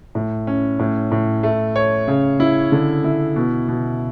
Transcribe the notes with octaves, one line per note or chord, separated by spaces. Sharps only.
A2
C#4
A2
A2
A3
C#5
C#3
E4
D3
E4
B2
B2